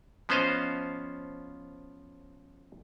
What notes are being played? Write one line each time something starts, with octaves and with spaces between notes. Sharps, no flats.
F3 B3 C#4 C5 D#5 F5